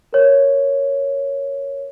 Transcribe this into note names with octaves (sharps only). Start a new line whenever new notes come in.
A#4 C#5